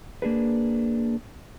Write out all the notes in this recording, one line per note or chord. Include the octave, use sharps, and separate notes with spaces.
A#3 D4 G#4 B4